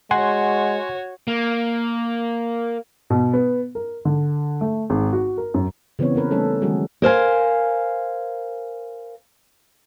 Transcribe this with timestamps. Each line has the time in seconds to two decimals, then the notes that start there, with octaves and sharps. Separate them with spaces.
0.11 G#3 F#4 C#5 F#5 G#5 C6
1.28 A#3
3.10 B2
3.33 B3
3.75 A#4
4.05 D3
4.61 A3
4.90 G#1
5.13 F#4
5.37 A#4
5.54 F#2
5.99 C#3 E3 B3 C4 C#5
6.15 A#3 C4 A#4 B4
6.31 G3 A3 C#4 D#4 A4
6.62 D#3 F#3 G#3 C#4 F#4 G#4
7.02 A#4 C5 F5 G#5